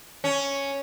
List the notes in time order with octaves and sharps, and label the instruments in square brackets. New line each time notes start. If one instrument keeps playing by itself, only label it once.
[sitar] C#4